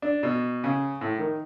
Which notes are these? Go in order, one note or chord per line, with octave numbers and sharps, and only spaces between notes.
D4
B2
C#3
A2
D#3